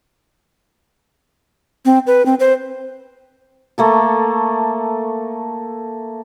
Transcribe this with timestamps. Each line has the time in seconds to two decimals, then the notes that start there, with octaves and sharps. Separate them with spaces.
1.85 C4
2.07 B4
2.26 C4
2.40 C5
3.78 A3 A#3 A4